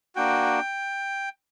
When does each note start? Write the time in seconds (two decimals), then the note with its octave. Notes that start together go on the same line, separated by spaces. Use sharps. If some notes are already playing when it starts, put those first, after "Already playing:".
0.15 A#3 D4 F#4 G5